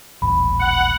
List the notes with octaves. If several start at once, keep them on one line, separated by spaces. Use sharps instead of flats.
D#1 A1 B5
F#5